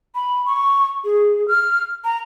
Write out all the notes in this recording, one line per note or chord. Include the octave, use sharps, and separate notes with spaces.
B5
C#6
G#4
F6
A#5